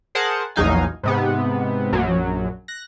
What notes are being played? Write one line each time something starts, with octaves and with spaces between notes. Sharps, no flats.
G#4 A#4 C5 F#5 A5
A#1 E2 F#3 D#4 F5 G#5
G#2 C3 B3
A#1 F#2 F#3
F#6 A#6